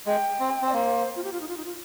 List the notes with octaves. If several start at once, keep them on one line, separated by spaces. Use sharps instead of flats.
G#3 G5
C4
C4
D5
A#3 C5
F4
G4
F4
D#4
F4
D#4
F4